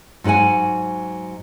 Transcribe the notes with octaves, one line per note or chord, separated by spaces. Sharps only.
G#2 F#3 F#4 F#5 G#5